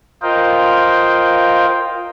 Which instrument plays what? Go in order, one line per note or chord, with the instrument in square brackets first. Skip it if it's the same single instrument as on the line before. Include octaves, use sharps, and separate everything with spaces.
[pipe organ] F4 A#4 C5 D#5 F5 G5